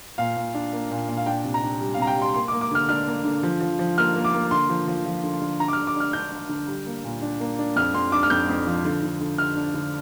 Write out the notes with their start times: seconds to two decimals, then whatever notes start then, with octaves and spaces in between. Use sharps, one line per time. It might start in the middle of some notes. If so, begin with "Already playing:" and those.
0.18 A#2 F5
0.36 A#2
0.54 D4
0.73 A#3
0.91 A#2
1.08 A#2
1.17 F5
1.26 D4 G5
1.44 C3
1.54 A#5
1.63 D4
1.81 G3
1.94 F5
1.98 C3 A#5
2.07 G5
2.16 G3
2.22 C6
2.34 A#3 C6
2.48 D6
2.52 A#3
2.61 D6
2.71 D3 F6
2.89 D4 F6
3.07 A#3
3.24 D3
3.43 F3
3.61 F3
3.79 F3
3.98 A#3 F6
4.16 A#3
4.24 D6
4.33 A#3
4.51 D3 C6
4.69 F3
4.88 F3
5.06 F3
5.23 D3
5.42 D3
5.60 D4 A#5
5.68 D6
5.73 F6
5.77 D3
5.87 D6
5.96 D4 F6
6.13 D4 G6
6.31 D4
6.49 D3
6.68 G3
6.86 A#3
7.04 A#2
7.22 D4
7.40 A#3
7.59 D4
7.76 F2 F6
7.94 F2 C6
8.12 D4 D6
8.23 F6
8.30 F2 G6
8.49 F2
8.67 F3
8.85 D3
9.03 D3
9.21 D3
9.38 D3 F6
9.57 D4
9.75 D3